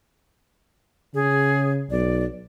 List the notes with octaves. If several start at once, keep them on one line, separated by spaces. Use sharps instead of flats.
C#3 G#4
B1 D5